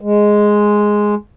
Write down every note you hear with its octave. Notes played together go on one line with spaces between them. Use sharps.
G#3